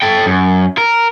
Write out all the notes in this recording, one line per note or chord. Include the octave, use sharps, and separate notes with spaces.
A4 G5
F#2
A#4